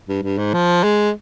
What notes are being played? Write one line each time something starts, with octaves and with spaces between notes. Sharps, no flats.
G2
G2
G#2
F3
G#3